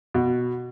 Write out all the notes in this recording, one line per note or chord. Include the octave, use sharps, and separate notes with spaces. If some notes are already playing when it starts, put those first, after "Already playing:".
B2